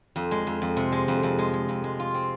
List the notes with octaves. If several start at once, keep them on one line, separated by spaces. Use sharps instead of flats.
F2
G#3
F2
F2
C3
G#3
F2
F2
G#3
G#3
F2
G#3
F4
C4